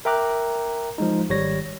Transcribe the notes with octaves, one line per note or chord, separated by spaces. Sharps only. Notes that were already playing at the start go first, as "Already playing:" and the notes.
A#4 E5 G5 A#5 D6 F#6
F3 G#3 D#4
G#1 G3 C#5 A#6